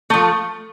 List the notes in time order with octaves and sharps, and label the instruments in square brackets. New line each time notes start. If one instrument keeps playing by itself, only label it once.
[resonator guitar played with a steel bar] F3 A3